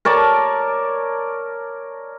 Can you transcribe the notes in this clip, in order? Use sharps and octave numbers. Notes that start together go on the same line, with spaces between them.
A#4 C#5 D5 A5